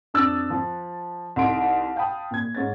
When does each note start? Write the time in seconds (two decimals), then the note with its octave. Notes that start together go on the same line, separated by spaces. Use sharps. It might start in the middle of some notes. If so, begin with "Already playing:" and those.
0.14 F2 D4 D#6 E6 F#6 A6
0.50 F3
1.36 C2 D#4 A4 C6 D7
1.96 F5 G5 A5 B5 D#6
2.31 A#2 G#6
2.55 G#2 C#4 A6